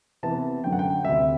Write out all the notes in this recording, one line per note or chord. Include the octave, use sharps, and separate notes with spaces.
C3 E3 B3 E4 A5
F#2 D3 F#3 G5
F#5
G5
D2 C3 G3 E5